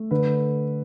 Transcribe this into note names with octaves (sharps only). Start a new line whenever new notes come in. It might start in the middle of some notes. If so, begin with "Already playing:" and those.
Already playing: A3
D3 B4